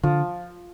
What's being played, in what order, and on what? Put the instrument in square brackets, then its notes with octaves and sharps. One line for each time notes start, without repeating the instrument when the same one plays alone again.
[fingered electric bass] D3 [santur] F3